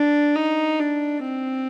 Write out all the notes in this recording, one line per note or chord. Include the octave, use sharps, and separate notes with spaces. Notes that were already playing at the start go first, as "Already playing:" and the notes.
Already playing: D4
D#4
D4
C4